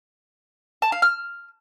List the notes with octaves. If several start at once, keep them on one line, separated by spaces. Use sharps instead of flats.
A5
F5
F6